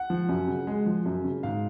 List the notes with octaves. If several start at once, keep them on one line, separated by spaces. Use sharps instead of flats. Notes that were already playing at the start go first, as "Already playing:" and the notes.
Already playing: F#5
F3
F#2
C#3
G#3
F3
F#2
C#3
G#2 F5